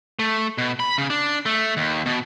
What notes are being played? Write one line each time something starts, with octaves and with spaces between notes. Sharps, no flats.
A3
B2
B5
C#3
D4
A3
D#2
B2